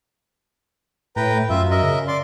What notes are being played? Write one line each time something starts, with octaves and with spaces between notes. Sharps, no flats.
A2 B4 G5 A#5
F#2 F4 E5
A#4 D#5 E5
C#3
D5 C6